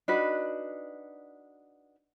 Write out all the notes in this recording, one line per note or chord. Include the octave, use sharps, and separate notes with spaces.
D4 D#4 F#4 B4